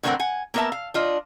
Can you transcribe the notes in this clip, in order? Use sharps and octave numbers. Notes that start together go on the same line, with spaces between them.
A2 D3 E3 C4 A#4 F#5
F#5 G#5
A#3 B3 A#4 C5 E5 A5
F5
D4 F4 D#5